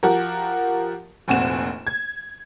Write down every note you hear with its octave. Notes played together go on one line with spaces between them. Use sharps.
F3 F#4 G4 A#4
F1 A#1 C4 F#4 E7
G#6